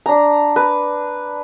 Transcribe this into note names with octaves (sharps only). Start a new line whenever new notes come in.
D4 A#5
B4